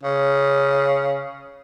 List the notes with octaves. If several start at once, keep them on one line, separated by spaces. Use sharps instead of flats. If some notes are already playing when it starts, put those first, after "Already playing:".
C#3